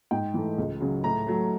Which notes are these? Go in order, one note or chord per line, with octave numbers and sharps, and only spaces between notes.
G#2 G5
E3 A3
C#2
C#3 F#3
A2 A#5
F#3 A3